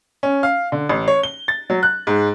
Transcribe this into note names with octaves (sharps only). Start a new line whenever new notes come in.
C#4
F5
D3
A1
C#5
G7
A6
F#3
F#6
G#2